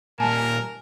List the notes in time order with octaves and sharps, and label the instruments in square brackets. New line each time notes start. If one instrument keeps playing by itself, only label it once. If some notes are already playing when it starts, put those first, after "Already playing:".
[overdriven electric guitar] A#2 G3 [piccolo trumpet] A#4 [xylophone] G#5 A5